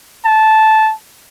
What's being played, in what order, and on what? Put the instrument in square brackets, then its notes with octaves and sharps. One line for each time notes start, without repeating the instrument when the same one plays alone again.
[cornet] A5